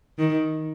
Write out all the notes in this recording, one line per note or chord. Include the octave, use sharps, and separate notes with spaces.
D#3